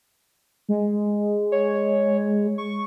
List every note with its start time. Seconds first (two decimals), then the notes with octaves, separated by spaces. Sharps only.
0.69 G#3
1.52 C#5
2.58 C#6